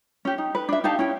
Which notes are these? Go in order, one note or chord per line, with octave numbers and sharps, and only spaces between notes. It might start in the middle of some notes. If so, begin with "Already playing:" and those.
C#4 G4
D#4
B4
D4 E5
D#4 G4 F5 A5
C#4 E4 G5